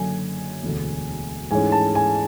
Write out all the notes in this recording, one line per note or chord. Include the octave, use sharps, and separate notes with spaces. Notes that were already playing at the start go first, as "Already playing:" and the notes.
Already playing: F#1 F#2 D3 G#5
E1 D2 D3
G#2 E3 A3 C#4 G#5
A5
G#5